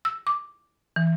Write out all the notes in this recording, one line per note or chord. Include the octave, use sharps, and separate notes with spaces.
E6
D6
E3